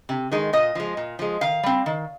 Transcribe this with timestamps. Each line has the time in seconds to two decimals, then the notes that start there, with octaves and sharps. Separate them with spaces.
0.09 C3
0.32 D#3 G#3
0.53 A#2 D#5
0.75 F3 G#3
0.97 A#2
1.19 F3 G#3
1.41 D#3 F5
1.63 G3 C4
1.86 D#3